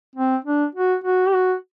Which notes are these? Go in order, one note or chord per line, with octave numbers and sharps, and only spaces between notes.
C4
D4
F#4
F#4
G4
F#4